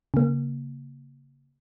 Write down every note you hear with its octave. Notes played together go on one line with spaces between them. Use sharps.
C#3 A#3